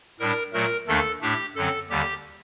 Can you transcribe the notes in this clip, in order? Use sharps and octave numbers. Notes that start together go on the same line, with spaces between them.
A2 G3 D4 A#4
A#2 F#3 A3 A#4
D#2 D#3 A3 D4 A4
A2 A3 D4 G4
F#2 D3 F#3 C4 A4
D#2 D3 G3 G4